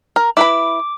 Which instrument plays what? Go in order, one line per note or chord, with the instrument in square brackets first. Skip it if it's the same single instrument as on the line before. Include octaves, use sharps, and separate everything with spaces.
[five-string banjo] A#4
[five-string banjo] E4 B4 B5 [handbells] D6